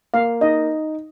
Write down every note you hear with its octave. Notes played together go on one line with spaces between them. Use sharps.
A#3 F5
D#4 D#5